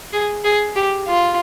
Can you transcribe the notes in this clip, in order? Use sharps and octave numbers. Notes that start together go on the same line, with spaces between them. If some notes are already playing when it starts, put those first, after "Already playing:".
G#4
G#4
G4
F4